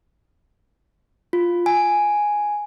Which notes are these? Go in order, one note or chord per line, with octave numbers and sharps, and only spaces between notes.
F4
G#5